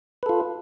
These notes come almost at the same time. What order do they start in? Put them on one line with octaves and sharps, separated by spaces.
B4 A4 F4